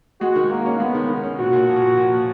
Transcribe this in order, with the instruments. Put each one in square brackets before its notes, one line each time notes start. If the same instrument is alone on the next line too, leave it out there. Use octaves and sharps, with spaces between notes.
[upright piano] G#3 [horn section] F#4
[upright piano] D#3
[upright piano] D#3 [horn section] A#3
[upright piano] C#4
[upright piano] G#3 [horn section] B3
[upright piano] D#3
D#3
C#4
[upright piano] A#2 [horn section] F#4
[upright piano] A#2
F3
A#2
A#2
F3